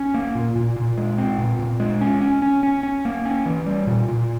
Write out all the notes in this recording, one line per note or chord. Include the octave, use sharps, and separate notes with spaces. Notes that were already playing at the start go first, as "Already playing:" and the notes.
Already playing: C#4
A#3
A#2
A#2
A#2
G#3
C4
A#2
A#2
G#3
C#4
C#4
C#4
C#4
C#4
A#3
C#4
E3
G3
A#2
A#2